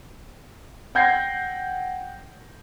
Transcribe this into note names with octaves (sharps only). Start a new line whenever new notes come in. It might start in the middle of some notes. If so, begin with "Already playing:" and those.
F#5 G5 G6 G#6 A#6 C7